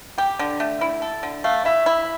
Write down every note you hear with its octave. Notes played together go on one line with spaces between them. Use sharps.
G4 G5
D3
A3
E4
A4
D3
A3 F5
E4 E5
E4